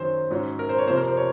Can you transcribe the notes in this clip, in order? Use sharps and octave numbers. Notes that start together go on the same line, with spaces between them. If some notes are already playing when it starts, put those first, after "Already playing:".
Already playing: F#2 D#3 F#3 C#4 C5
G#2 F#3 C#4
A#4
C5
C#5
F2 C3 F3 C5
A#4
C5
C#5